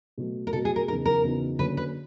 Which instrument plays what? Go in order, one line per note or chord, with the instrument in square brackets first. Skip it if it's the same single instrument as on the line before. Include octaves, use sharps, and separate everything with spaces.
[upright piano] B2 F#3 A3
[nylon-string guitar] A#4
[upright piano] B2 F#3 A3 [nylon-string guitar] A4
[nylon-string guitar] G#4
A#4
[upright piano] E2 C#3 F#3 B3 D#4 [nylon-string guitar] A#4
[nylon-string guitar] A#4
[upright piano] E2 C#3 F#3 B3 D#4
[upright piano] D3 F#3 A#3 C#4 [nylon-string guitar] B4
[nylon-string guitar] B4